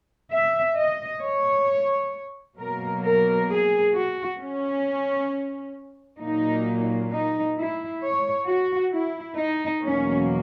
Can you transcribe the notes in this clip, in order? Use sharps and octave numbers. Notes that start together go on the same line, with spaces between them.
E5
D#5
C#5
B2 F#3 A#3 A#4
A#4
G#4
F#4
C#4
A#2 F#3 A#3 D#4
D#4
E4
C#5
F#4
E4
D#4
E2 B2 F#3 A#3 C#4